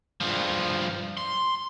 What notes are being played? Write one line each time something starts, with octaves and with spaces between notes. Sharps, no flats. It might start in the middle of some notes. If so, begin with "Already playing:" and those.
G2 F3
C6